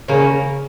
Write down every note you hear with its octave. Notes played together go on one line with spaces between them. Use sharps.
C#3 A#3 C#4